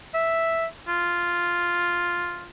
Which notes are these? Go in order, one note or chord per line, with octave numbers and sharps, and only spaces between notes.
E5
F4